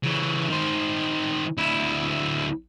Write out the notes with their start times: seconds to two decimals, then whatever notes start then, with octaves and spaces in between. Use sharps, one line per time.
0.04 C#3 E3
0.50 D#3 C5
1.57 D2 E4